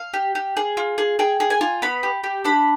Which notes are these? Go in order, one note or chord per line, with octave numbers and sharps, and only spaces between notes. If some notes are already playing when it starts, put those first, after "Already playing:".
Already playing: F5
G4
G4
G#4
F4
G#4
G#4 G5
G#4
G#5
F4
B3 B5
G4
G4
D4 B5